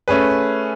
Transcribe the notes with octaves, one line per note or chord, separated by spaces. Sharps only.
A3 C#4 G#4 B4